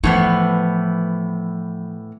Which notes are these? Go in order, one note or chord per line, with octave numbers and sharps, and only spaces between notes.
A2 E3 F3 B3